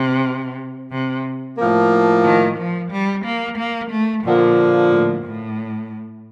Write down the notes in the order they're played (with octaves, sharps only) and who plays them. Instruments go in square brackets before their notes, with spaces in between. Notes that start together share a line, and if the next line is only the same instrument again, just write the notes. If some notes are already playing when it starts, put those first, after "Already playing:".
Already playing: [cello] C3
C3
[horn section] A2 F3 A#3
[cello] D#3
F3
G3
A#3
A#3
A3
[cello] A#2 [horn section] D3 F3 A#3
[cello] A2
A2